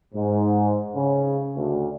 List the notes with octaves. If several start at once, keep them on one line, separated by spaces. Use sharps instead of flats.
G#2
C#3
D2